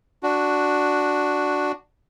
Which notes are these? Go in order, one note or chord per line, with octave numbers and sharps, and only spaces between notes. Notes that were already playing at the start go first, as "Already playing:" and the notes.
D4 F#4